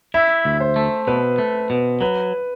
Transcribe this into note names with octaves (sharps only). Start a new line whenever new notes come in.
E4 E5
D2
C5
A3
B2 B4
A3
B2
F#3 B4